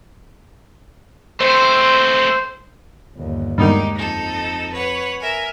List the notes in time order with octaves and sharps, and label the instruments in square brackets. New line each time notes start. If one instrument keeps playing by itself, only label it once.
[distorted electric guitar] A3 C4 [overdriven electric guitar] C5
[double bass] G1 D#2
[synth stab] G2 B2 D#3 [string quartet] G#3 D#4 G4
[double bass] F2 [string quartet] D#4 A4
[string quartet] B4 C#5 F#5
A#4 E5 G#5